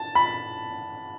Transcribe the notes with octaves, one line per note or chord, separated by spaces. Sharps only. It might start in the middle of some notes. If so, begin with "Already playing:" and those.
Already playing: A5
B5